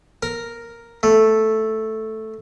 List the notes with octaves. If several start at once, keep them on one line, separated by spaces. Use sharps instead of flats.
A#4
A3